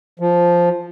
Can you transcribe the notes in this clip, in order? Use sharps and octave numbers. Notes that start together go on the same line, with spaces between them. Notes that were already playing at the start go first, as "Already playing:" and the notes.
F3